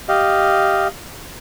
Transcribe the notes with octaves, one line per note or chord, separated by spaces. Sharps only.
G4 D#5 F5